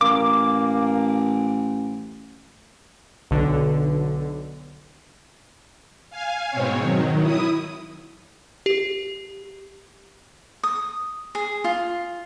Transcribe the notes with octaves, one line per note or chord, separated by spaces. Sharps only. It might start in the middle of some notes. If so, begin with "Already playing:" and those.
A1 A#3 D6
B1 D3
F5 G#5
G#2 B2 C4 C#5
D#3 F#3
E4 D#6
G4
D#6
G#4
F4